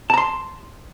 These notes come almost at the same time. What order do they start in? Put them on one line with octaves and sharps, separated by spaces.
A5 A#5 C6